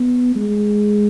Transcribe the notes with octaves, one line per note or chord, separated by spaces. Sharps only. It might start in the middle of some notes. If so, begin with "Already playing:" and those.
Already playing: B3
G#3